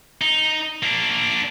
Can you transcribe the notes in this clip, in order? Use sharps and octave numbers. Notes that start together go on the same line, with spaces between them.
D#4
A#3 D4